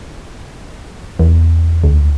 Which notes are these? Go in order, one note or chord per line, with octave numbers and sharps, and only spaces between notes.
E2
D2